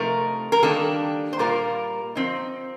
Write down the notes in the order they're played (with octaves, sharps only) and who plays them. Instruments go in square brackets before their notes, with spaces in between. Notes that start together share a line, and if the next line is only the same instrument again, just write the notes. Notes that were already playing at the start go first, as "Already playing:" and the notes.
Already playing: [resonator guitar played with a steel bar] C3 F3 A3 D#4 A#4
A#4
D#3 G3 A#3 D4 A4
C5
A#2 G3 A#3 F4 A#4
F3 C4 D#4